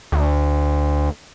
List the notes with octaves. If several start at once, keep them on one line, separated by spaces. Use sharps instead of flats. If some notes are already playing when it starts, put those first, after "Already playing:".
D2